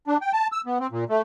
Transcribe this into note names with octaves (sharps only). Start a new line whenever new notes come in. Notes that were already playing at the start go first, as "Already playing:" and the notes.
D4
G5
A5
E6
B3
C4
A#2
A3